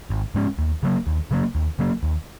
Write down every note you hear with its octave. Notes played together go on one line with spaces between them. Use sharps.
G#1
G#2 G#3 C#4
D#2
C#3 F#3 A#3
D#2
C#3 F#3 A#3
D#2
C#3 F#3 A#3
D#2